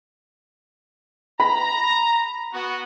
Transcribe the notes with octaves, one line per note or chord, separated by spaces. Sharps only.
A#5 B5
B3 F#4